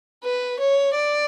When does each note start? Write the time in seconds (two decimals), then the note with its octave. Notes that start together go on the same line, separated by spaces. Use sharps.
0.24 B4
0.60 C#5
0.95 D5